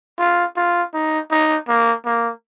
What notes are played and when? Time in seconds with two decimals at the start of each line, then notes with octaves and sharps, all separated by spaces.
0.19 F4
0.57 F4
0.94 D#4
1.31 D#4
1.68 A#3
2.05 A#3